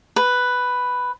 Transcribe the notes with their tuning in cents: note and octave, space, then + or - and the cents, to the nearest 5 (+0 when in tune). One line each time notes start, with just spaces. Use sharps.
B4 +5